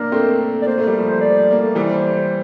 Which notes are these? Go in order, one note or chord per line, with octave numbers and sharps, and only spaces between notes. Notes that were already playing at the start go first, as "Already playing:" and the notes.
Already playing: A#3 D4 A#4
A3 C4
D5
A#3 C5
A3
G3
F3 A3
C5
D5
A#3
A3
E3 G3 C5